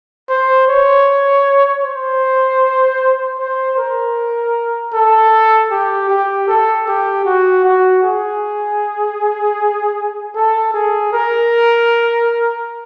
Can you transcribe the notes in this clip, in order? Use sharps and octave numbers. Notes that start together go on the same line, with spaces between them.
C5
C#5
C5
C5
A#4
A4
G4
G4
A4
G4
F#4
F#4
G#4
A4
G#4
A#4